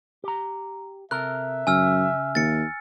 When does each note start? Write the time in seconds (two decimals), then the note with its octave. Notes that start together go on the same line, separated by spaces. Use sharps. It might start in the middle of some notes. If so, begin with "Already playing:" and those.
0.24 G4 A#5
1.11 C3 A4 A#4 E5 F#6
1.67 F#2 C#3 G#5 E6 F6
2.35 D#2 A6 C#7